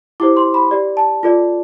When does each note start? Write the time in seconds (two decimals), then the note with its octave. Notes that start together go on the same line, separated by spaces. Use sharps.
0.20 E4 G4 C5 D6
0.37 C6
0.54 B5
0.71 G4 D5
0.97 A5
1.23 F4 A4 D5